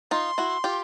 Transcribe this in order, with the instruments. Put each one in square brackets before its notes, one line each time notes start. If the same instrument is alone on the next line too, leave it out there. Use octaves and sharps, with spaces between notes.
[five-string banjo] D#4 F4 [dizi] C6
[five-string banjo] E4 F#4
F4 G4